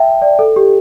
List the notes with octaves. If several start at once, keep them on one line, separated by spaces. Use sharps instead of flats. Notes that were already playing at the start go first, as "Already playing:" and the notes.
Already playing: E5 G5 A5
D5
A4
G4